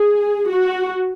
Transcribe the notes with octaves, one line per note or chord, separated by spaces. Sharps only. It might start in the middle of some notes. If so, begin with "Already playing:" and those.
Already playing: G#4
F#4